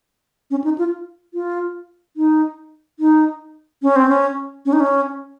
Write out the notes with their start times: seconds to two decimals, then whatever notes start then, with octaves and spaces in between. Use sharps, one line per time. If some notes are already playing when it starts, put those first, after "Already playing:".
0.51 C#4
0.64 D#4
0.78 F4
1.34 F4
2.17 D#4
3.00 D#4
3.82 C#4
3.96 C4
4.09 C#4
4.66 C#4
4.73 D#4
4.80 C#4